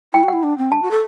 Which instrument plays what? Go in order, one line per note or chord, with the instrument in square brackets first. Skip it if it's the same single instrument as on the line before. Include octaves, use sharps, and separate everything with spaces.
[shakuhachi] E4 [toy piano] G5
[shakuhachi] F#4
[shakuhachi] E4 [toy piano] F#5
[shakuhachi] D4
C4
[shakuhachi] D4 [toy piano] A5
[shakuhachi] F#4
A4